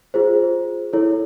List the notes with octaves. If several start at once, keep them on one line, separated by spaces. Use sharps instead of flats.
F4 G#4 C5
E4 A4 C#5